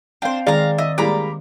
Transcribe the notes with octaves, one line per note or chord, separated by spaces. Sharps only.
C4 D4 C5 F5 G5
D#3 G#3 D5 F5 A#5
D#5 E5
G3 G#3 A#3 A#5 B5 D6